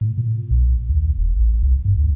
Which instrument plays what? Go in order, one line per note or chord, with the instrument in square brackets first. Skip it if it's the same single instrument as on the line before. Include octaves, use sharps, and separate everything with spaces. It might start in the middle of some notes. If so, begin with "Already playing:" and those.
[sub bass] A2
A#2
B1
D#2
E1
A1
C2
G2
D2